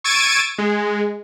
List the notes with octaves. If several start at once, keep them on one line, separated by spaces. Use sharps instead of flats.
C#6 E6 G#6 A6 D7 D#7
G#3